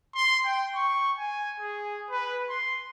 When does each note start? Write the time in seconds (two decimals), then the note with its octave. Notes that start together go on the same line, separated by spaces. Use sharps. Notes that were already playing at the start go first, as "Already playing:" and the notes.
0.15 C6
0.46 G5
0.76 C#6
1.18 G#5
1.60 G#4
2.11 B4
2.50 C6